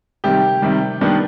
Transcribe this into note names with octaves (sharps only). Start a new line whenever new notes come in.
C3 D#3 G3 G4
C3 D#3 G3
D#3 G3 B3 D4